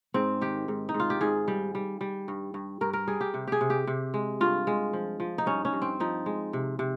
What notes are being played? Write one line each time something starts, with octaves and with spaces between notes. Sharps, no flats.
G#2 C4
D#3 G4
G#2
D#4
G#2
F4
G4
G#2 G#4
G3
G3
G3
G2
G2
G2 A#4
A#4
G3 G#4
G4
C3
G4 G#4
C3
G4
C3
G#3
G2 F4
G#3
F3
F3
D#4
G2 C#4
C#4
G2
C4
F3 D#4
G#3
C3
C3